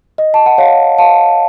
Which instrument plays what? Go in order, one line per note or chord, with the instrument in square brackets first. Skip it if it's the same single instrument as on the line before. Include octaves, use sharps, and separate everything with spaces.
[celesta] D#5
A5
F#5
C#5 F5
F5 A5